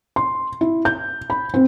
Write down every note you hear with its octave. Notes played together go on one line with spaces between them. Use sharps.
C6
E4
G6
B5
C4